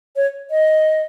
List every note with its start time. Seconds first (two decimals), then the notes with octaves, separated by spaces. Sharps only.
0.16 C#5
0.51 D#5